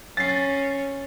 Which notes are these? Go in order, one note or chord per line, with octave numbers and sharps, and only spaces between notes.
C#4 A6 C7